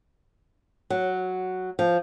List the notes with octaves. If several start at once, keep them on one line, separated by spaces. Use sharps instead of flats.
F#3
F3